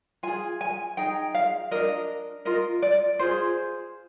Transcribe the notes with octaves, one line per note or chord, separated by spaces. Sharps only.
F4 G#4 G#5
G#5
D#4 G#4 G5
F5
D4 F4 A#4 D#5
F4 A#4 D#5
D5
F4 G#4 C5